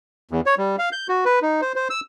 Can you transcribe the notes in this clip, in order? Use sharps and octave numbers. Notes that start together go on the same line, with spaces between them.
E2
C#5
G3
F5
G6
F#4
B4
D#4
C5
C5
E6